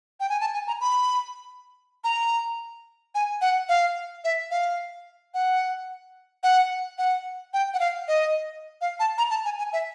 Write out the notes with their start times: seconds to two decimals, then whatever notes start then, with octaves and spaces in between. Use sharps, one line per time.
0.20 G5
0.29 G#5
0.41 A5
0.54 G#5
0.67 A#5
0.81 B5
2.04 A#5
3.15 G#5
3.41 F#5
3.69 F5
4.24 E5
4.51 F5
5.34 F#5
6.43 F#5
6.98 F#5
7.53 G5
7.74 F#5
7.80 F5
8.08 D#5
8.81 F5
9.00 A5
9.18 A#5
9.30 A5
9.45 G#5
9.58 G#5
9.73 E5